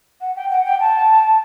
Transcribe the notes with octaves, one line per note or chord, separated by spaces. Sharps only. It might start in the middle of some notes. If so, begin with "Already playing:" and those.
F#5
G5
F#5
G5
A5